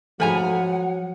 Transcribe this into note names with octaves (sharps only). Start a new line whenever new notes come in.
G#2 F3 F#3 A3 F#5 G#5 A#5